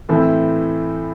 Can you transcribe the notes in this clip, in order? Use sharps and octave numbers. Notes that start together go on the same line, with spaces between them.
A2 E3 A3 C4 E4